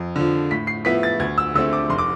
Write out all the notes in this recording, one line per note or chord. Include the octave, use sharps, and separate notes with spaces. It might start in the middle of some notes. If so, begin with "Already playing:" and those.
Already playing: F2
D3 F3
A2 B6
C7
F3 B3 E4 B6
A6
D2 G#6
E6
D3 A3 C4 E6
D6
F1 C6
D6